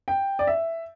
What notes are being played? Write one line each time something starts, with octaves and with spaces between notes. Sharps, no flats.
G5
D5
E5